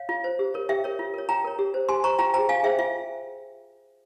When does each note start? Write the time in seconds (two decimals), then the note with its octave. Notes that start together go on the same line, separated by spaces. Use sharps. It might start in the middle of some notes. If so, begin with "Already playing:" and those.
Already playing: C#5 F5
0.09 F4
0.24 C5
0.39 G4
0.54 A#4 C#5
0.69 G4 E5 G5
0.84 A#4 C#5
0.99 F4
1.14 A#4 C#5
1.29 F4 G5 A#5
1.44 A#4 C#5
1.59 G4
1.74 C5
1.89 G4 G#5 C6
2.04 C5 A#5 C#6
2.19 F4 G5 A#5
2.34 G#4 C5 G5 A#5
2.49 F4 F5 G#5
2.63 G#4 C5 E5 G5
2.79 F4 E5